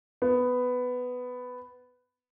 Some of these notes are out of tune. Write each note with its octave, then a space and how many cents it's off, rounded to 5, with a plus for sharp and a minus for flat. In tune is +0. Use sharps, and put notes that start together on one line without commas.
B3 +10